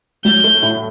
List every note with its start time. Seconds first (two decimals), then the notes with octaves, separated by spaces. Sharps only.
0.24 F#3 G6
0.44 A3
0.62 A2